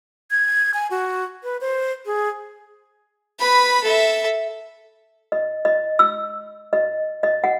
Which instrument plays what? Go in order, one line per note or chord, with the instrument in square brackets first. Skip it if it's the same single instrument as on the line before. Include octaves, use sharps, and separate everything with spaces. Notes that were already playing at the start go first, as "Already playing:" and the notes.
[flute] G#6
G#5
F#4
B4
C5
G#4
[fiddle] B4 B5
A4 E5
[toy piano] D#5
D#5
E6
D#5
D#5
F#5